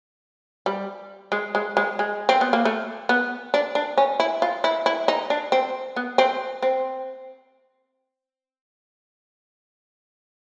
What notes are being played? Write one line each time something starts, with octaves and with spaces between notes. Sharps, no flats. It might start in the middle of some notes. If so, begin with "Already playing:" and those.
G3
G#3
G#3
G#3
G#3
C4
B3
A#3
A3
B3
D4
D4
C#4
E4
F4
E4
E4
D#4
D4
C4
B3
C4
C4